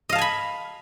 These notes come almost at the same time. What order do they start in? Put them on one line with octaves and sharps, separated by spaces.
D#5 F5 A5 G#5 B5